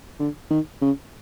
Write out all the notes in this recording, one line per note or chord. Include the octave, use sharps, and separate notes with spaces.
D3
D#3
C#3